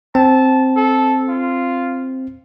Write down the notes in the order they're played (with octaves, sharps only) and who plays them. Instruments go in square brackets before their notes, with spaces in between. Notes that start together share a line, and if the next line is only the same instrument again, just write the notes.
[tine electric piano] C4 [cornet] A5
[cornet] A4
F4